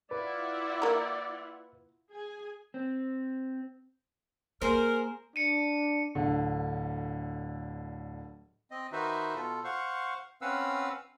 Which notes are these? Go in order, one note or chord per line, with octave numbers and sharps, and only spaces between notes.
E4 F4 B4 D5 F#5
A#3 A#5
G#4 G#5
C4
A#3 G#4 A#4 C5
D4 C#7 D#7
D1 D3
C4 D#5
D#3 D#4 F#4 B4 C5 E5
B2 F4 A4
C5 F5 F#5 C#6
C4 C#4 B4 F5 F#5 E6